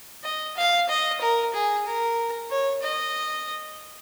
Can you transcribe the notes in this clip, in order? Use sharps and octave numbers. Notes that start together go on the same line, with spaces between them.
D#5
F5
D#5
A#4
G#4
A#4
C#5
D#5